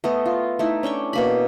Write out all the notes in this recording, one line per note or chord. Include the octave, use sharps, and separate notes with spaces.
A3 B3 D#5
F4
A3 D#4 E4
C#4 D4 G5 C#6
B2 A#3 B5